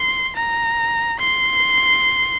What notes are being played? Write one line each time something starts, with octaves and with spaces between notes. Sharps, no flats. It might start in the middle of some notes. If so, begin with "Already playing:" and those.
Already playing: C6
A#5
C6